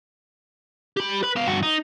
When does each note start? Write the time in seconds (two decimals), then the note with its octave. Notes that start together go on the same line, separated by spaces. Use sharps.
0.97 G4 B5
1.23 B4 B5
1.36 B3 F5
1.48 G2 F#4
1.63 D#4